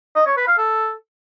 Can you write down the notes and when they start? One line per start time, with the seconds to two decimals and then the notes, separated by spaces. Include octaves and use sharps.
0.16 D#5
0.26 C#5
0.37 B4
0.47 F5
0.58 A4